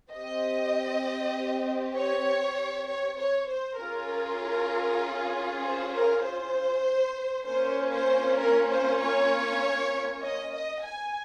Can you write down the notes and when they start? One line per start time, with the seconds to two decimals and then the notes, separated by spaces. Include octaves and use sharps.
0.11 C4 G4 D#5
1.94 C#5
2.87 C#5
3.18 C#5
3.47 C5
3.79 C#4 F4 G#4 A#4
5.62 C5
5.93 A#4
6.24 C5
7.46 A#3 C#4 F4 C5
7.92 C5
8.38 A#4
8.69 C5
8.99 C#5
10.22 D#5
10.53 D#5
10.83 G#5